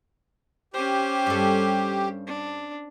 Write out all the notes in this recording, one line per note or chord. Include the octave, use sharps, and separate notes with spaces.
C#4 G4 C5
G2 A4
D4